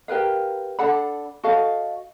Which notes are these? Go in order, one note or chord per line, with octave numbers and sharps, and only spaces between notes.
G4 A#4 B4 F5
D4 A4 F#5 B5
F#4 A4 D#5 F5